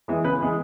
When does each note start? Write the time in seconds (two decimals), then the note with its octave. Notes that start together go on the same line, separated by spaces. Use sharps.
0.08 E3 G#3 B3
0.24 C#3 B4
0.40 E3 G#3 B3